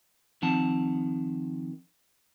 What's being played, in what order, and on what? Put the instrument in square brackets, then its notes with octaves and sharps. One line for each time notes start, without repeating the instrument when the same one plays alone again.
[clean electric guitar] D#3 F3 C4 F#5 A5